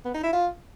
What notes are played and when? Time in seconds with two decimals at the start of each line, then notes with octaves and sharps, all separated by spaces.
0.05 B3
0.14 D#4
0.23 E4
0.33 F4